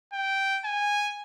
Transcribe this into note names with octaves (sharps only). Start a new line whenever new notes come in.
G5
G#5